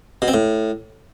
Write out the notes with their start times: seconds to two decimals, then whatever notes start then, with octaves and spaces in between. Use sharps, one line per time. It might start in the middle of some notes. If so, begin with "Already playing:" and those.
0.22 B2
0.28 C4
0.34 A2